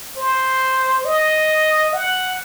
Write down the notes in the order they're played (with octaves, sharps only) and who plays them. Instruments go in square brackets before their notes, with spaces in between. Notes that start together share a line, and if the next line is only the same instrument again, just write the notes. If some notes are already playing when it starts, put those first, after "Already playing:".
[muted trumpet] C5
D#5
F#5